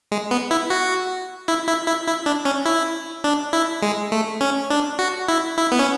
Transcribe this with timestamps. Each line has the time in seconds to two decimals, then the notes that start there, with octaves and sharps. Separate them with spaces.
0.12 G#3
0.31 B3
0.51 E4
0.70 F#4
1.48 E4
1.68 E4
1.87 E4
2.07 E4
2.26 D4
2.45 C#4
2.65 E4
3.24 D4
3.53 E4
3.82 G#3
4.12 A3
4.41 C#4
4.70 D4
4.99 F#4
5.28 E4
5.58 E4
5.72 B3
5.79 C#4